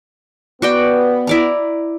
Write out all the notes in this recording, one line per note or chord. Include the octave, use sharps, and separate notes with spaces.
B3 F#4 D5 G5
E4 D5 A#5